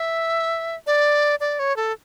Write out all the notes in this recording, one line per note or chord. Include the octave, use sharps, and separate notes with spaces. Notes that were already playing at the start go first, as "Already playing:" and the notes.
Already playing: E5
D5
D5
C#5
A4